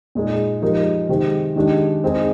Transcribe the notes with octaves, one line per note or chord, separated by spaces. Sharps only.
A#2 G#3 D#4 G#4
F3 G#3 D#4 G4 A#4
C3 D#3 G#3 C4 G4
D#3 G#3 D4 G4
G#3 C4 D#4 G#4